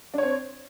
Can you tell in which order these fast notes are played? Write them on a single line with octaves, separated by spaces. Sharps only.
D4 C#5 C4